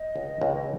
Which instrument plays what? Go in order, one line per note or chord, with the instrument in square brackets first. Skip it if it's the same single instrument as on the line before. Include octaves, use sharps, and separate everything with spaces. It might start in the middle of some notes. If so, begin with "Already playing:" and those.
Already playing: [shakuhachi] D#5
[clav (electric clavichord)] C#2
C#2